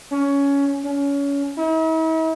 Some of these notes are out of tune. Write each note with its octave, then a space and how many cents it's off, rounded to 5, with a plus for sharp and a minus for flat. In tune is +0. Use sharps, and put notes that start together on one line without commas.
C#4 +15
C#4 +25
E4 -45